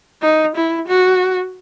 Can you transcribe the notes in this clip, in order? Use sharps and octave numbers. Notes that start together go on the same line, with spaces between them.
D#4
E4
F#4